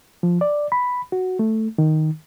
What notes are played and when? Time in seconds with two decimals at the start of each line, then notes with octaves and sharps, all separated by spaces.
0.23 F3
0.41 D5
0.72 B5
1.12 F#4
1.39 A3
1.78 D#3